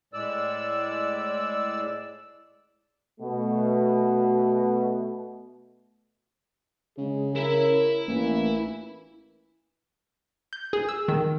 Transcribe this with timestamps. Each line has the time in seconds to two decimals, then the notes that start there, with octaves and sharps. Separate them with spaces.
0.14 A2 G#3 D5 E6
3.20 B2 A3
6.98 C#3 G#3 G#4
7.35 C#4 E4 A#4 E5
8.07 A1 E3 A#3
10.53 G6
10.73 G#4
10.89 E6
11.08 D#3